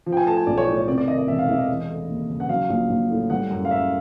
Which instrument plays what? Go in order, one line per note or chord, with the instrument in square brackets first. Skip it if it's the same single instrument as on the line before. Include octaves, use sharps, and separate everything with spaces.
[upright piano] F3
G5
G#5
A3 A5
G#5
B1 D5
C#5
A2 D5
C#5
C3 D5
D5
D#3 D#5
D#5
E1 E5
F5
E2 E5
D#5
E3
A3
D#2
C#3
F#5
F#3 F5
A#1
A#1
A2
G3 F#5
F#2
F5
F#2 E5